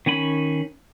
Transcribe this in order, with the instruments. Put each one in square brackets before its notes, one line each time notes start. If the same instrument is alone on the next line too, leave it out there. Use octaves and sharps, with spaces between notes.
[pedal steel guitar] D#3 C#4 G#5 B5